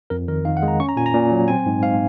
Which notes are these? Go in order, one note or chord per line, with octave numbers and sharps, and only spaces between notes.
F2 A#4
D#3 A#4
D#3 F5
F#5
G#3
A#5
C#4 C#6
A#5
A#2 G#5
A#5
A#2
F#3
C4 G#5
G#2
G#2 F5